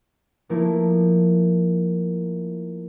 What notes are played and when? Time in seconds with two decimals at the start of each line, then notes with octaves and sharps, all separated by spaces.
0.49 F3 A3 A#3 E4